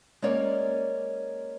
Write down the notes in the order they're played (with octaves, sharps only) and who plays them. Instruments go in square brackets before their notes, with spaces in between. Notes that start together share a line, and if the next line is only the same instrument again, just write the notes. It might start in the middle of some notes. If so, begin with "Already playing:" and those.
[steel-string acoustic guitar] G#3 A#3 C#4 A#4 C#5 D5